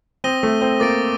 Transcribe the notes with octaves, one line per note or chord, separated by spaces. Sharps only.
C4 D#6 A#6 D#7 G7
A3
C4
A#3 D6 A6 D7